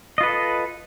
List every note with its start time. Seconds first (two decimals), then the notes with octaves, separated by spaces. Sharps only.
0.18 D#5
0.21 F4
0.23 B4
0.26 A4